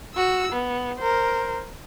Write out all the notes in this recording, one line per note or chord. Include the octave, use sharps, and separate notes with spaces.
F#4 E6
B3
A#4 C5